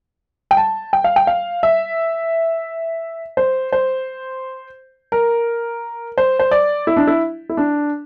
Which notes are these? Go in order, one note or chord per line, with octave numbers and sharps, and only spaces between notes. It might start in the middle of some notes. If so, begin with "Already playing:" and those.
G5
A5
G5
F5
G5
F5
E5
C5
C5
A#4
C5
C5
D5
E4
D4
E4
E4
D4